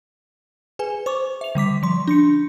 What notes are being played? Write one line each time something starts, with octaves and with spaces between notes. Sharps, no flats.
G#4 B4 G#5
C5 C#6 D6
E5 F7
D3 G3 D6 B6
F3 C6
D4 C6 C#7